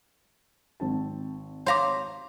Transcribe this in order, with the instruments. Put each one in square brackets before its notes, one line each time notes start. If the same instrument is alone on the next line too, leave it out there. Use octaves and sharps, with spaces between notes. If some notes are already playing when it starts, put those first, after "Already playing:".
[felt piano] G#1 C4 A5
[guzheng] C5 A#5 [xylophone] C#5 F5 D6